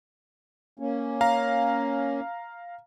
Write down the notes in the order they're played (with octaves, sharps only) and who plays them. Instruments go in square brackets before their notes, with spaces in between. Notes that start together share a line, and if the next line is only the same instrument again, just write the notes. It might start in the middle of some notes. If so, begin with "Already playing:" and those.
[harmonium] A#3 C#4
[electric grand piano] F5 A#5